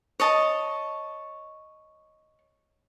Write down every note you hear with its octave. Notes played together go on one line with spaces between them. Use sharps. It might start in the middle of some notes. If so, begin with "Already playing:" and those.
C#5 D#5 A5